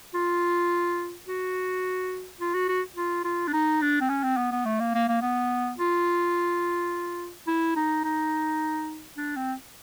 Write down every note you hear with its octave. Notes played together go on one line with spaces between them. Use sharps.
F4
F#4
F4
F#4
F#4
F4
F4
D4
D#4
D4
C4
C#4
C4
B3
B3
A3
A#3
A#3
A#3
B3
F4
E4
D#4
D#4
D4
C4